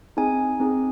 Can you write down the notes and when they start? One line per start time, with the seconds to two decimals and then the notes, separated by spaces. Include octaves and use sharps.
0.17 C4 D#4 G#4 G#5
0.60 C4 D#4 G#4